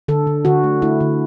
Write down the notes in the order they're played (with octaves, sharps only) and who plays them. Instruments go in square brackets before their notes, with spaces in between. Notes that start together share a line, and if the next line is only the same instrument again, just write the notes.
[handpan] D3 A4
D3
D3 F#4
A3
A3 E4
D3